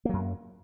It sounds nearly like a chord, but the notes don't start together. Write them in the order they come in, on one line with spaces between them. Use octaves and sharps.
A#3 F#3 F#2